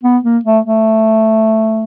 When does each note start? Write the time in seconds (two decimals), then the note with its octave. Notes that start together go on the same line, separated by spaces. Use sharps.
0.03 B3
0.24 A#3
0.45 A3
0.65 A3